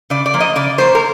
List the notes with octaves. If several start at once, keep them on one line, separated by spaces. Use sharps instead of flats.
C#3 D5
D5
F3 A#3
D#5
C#3 D5
F3 A#3 C5
A#4